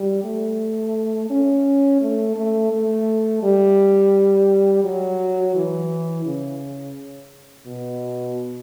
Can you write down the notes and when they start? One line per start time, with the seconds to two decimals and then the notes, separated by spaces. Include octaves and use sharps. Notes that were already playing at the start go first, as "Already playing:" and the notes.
Already playing: G3
0.24 A3
1.30 C#4
2.01 A3
2.37 A3
2.72 A3
3.43 G3
4.84 F#3
5.55 E3
6.26 C#3
7.66 B2